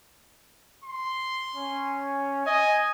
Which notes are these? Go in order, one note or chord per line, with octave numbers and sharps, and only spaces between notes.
C6
C#4
D#5 G#5